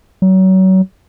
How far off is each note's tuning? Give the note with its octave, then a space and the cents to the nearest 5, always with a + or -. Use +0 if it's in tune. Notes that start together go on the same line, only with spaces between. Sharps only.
F#3 +30